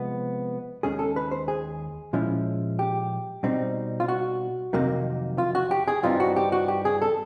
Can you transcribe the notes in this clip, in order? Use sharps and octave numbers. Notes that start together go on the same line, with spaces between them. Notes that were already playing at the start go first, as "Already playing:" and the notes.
Already playing: C3 F3 G#3 B3
D#2 D#3 G#3 C#4 G#4
A4
B4
C5
G#4
A#2 F3 G#3 C#4 E4
G4
B2 G3 C4 D#4
F4
F#4
F2 C3 D#3 F#3 A#3
F4
F#4
G4
G#4
G2 E3 G3 C4 D#4 F4
F#4
G4
F#4
G4
G#4
A4